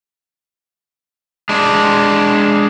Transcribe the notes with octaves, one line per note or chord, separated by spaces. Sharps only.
G#3 D4